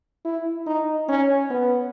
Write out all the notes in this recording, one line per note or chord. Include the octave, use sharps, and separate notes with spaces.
E4
D#4
C#4
B3